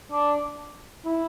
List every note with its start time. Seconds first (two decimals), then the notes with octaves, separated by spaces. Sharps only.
0.12 D4
1.05 E4